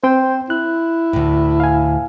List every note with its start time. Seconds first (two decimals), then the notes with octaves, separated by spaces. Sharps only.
0.04 C4 C5 G5
0.50 E4 F#6
1.13 D2 A2
1.60 F5 G#5